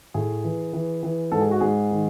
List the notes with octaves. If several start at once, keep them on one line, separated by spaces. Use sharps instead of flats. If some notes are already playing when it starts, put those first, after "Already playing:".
A2 G#4
E3
E3
E3
G#2 A4
G#4
F#4
G#2 G#4
D#3